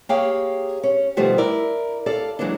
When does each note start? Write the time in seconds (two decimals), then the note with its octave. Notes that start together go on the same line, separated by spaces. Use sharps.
0.09 A#3 G4 G#4 C#5 F5 G5
0.83 C#4
1.17 B2 D#3 F3 G3 A3 F#4
1.38 E4 A#4 D5
2.06 A4 D5 F5
2.39 E3 F#3 G#3 A#3 D4